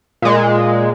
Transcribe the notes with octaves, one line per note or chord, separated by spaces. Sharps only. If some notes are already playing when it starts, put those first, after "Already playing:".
A#2 G#3